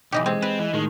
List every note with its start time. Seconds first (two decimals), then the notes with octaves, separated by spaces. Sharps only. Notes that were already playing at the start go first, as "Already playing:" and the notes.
0.12 B1 E3 D#4 G4 D#5
0.26 G#3 C4
0.42 C4 B4
0.59 E3
0.73 A2 D#3 G#3